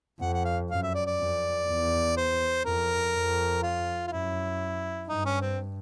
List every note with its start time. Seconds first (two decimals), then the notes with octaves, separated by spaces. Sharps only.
0.21 F2 F#5
0.34 F#5
0.45 F5
0.70 F#2 F5
0.83 E5
0.94 D5
1.06 D5
1.19 F2
1.67 E2
2.17 C5
2.65 F2 A#4
3.14 F2
3.63 F4
4.07 F4
4.11 F#2 E4
5.09 G2 D#4
5.25 C#4
5.41 C4